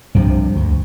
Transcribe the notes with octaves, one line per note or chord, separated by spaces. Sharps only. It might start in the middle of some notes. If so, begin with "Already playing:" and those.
C2 G2 C3 F3
D2